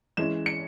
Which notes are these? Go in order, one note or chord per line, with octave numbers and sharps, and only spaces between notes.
E3 G#3 C#4 E7
C#7